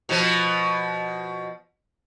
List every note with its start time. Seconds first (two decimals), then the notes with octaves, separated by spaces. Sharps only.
0.09 B2 F3